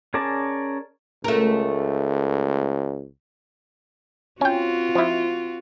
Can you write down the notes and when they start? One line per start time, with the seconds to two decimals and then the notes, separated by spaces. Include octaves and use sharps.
0.14 C#4 G#4 A#4 D5 A5
1.24 C#2 A3 A#4
4.41 C4 C#4 F4 F#4 G5
4.95 F3 E4